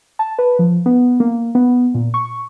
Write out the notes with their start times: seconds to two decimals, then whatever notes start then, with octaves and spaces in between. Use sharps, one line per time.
0.19 A5
0.39 B4
0.59 F3
0.86 B3
1.20 A#3
1.55 B3
1.94 A#2
2.14 C#6